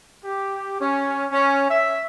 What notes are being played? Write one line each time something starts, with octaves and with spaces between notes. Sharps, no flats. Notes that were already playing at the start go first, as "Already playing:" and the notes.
G4
C#4
C#4
E5